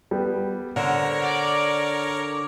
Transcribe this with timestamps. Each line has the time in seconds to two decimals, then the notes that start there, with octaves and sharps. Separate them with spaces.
0.11 G3 B3
0.76 D3 A#4 C5 C#5 F#5
1.25 D5